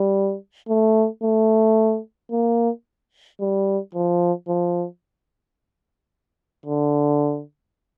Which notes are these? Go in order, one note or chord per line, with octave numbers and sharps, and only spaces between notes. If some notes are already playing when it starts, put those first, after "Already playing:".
Already playing: G3
A3
A3
A#3
G3
F3
F3
D3